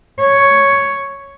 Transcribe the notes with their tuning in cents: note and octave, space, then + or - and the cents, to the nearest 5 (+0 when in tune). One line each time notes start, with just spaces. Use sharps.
C#5 +5